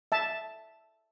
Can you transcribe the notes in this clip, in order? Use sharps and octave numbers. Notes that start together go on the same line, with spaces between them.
E5 A5